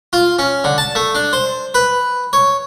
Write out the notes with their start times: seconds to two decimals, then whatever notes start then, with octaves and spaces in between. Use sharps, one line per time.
0.13 F4
0.39 C#4
0.64 D3
0.78 A5
0.95 A3
1.15 D4
1.33 C5
1.74 B4
2.33 C#5